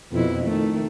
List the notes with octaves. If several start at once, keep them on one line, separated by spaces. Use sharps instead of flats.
F2 B2 E4
D#3 A3